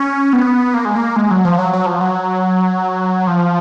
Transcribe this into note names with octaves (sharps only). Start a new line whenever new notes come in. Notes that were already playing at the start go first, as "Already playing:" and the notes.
Already playing: C#4
B3
A#3
G#3
A#3
G#3
F#3
F3
F#3
F#3
F3
F#3
F3